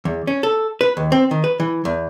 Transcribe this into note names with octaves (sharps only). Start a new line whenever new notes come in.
E2
C#4
A4
B4
D#2
C4
D#3
B4
E3
E2